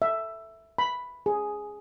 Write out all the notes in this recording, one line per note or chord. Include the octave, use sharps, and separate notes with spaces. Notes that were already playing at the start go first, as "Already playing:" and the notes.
E5
B5
G#4